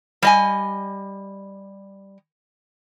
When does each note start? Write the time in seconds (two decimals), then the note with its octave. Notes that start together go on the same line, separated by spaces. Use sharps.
0.22 G3 D#5 G#5